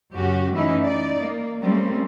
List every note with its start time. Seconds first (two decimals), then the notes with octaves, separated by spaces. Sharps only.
0.15 F#2 C#3 C#4 F#4 G4
0.53 E3 A3 C#4 D#4 E4
0.84 D#4 D5
1.20 A#3
1.63 G3 A3 A#3 C4 C#4